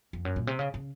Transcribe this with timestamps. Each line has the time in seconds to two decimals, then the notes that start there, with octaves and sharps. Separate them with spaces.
0.13 F2
0.25 F#2
0.36 A#2
0.47 C3
0.59 C#3
0.74 C#3